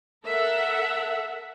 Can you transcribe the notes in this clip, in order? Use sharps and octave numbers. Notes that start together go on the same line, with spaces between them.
A4 A#4 E5 F#5